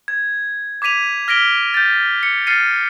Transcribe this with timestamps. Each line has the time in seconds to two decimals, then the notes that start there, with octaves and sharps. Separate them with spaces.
0.08 G#6
0.82 D6 G#6 B6 D#7 F7
1.28 F6 A#6 B6 D7 G7
1.74 G6 A6
2.23 C#7
2.47 F6 A6 C7 C#7 D#7